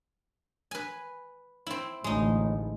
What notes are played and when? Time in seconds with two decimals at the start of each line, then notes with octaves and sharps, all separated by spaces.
0.71 B4 G#5
1.67 C4 E4
2.04 A1 D2 G#3 D#4